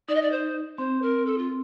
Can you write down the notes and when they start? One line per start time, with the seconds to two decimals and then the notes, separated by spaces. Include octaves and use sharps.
0.08 D#4 D5
0.15 D#5
0.22 D5
0.31 C5
0.78 C4 C5
1.02 A#4
1.26 A4
1.38 F4